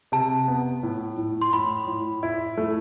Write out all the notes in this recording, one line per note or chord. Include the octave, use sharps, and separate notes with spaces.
C3 A5
B3
A2
A2
C6
A2 B5
A2
E4
A3